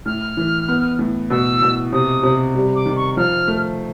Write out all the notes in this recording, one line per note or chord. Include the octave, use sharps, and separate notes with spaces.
A2 F6
E3
B3
A2
B2 E6
B2
C3 D#6
C3
G3
D6
D#3
C#6
F3 F6
A3